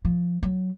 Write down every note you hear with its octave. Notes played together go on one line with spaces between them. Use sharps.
F3
F#3